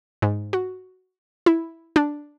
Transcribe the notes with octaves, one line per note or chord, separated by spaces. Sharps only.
G#2
F#4
E4
D4